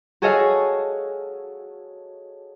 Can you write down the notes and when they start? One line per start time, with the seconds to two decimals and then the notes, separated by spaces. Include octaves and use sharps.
0.22 F#4 G#4 A4 C#5 D#5 F5